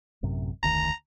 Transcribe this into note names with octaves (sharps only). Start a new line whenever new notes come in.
A1 F#2 C3
F1 D2 D#3 A#5